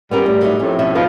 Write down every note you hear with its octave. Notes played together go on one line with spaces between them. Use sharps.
A#2 E3 G3 B3 C#4 A#4
A2
F#3 A3 D#4
F2 A2 C#4
B2 C#4 E5
B2 F3 D#4 B4